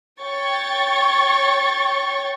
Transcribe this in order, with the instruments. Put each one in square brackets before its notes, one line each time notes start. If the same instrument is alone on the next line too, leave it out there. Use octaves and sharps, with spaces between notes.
[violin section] C#5 G5 C#6 A6